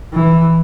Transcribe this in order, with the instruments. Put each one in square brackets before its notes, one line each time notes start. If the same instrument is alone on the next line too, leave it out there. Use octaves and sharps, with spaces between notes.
[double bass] E3